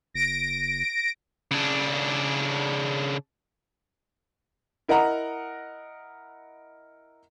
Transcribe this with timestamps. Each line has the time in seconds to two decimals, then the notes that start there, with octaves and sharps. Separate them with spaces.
0.14 F#1 A#6 D7
1.51 C#3 D4
4.88 E4 A#4 D#5 F#5 A#5